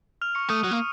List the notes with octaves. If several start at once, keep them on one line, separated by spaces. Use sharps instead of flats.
F6 F7
C#6 C#7
A3 D#6 D#7
F#3
A#3